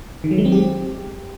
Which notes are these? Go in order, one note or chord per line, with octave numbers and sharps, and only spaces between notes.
D#3
F#3
G#3
C4
G4